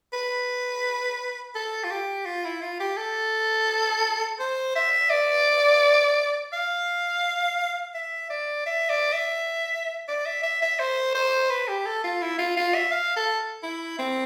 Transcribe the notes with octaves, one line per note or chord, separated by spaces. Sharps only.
B4
A4
F4
G4
F4
E4
F4
G4
A4
C5
E5
D5
F5
E5
D5
E5
D5
E5
D5
E5
E5
E5
C5
C5
B4
G4
A4
F4
E4
F4
F4
E5
F5
A4
E4
C4